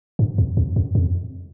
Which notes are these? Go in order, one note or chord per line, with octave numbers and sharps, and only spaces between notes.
G2
E2
E2
F2
F2